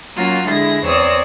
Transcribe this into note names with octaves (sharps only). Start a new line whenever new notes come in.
F#3 A#3 C#4 F4 F#4
D3 G#3 E4 G#4 A#6
E2 C4 C#5 D5 D#6 E6